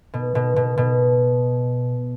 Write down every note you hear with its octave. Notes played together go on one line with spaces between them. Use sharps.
B2
B2
B2
B2